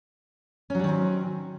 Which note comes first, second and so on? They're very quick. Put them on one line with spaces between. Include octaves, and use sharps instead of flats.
C#4 F#3 G3 D#3 C4